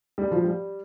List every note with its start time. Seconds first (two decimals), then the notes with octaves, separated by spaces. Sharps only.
0.18 G3
0.31 F3
0.44 G3